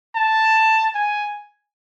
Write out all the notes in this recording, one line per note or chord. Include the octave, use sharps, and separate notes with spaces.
A5
G#5